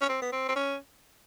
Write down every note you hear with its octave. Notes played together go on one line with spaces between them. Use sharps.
C#4
C4
B3
C4
C4
C#4